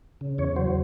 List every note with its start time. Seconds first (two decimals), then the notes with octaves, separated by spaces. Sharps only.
0.21 C#3
0.38 E2 C#5
0.56 F#3 C5